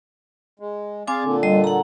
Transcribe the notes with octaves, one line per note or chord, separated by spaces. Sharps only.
G#3
C4 G#4 D5 F5 G#5 D6
A#2 D3
G3 D#5
F#5 A#5